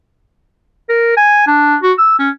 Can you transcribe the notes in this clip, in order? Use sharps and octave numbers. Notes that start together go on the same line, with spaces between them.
A#4
G#5
D4
F#4
E6
C#4